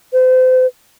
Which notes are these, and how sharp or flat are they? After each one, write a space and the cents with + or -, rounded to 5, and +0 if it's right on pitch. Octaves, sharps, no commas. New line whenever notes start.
C5 -35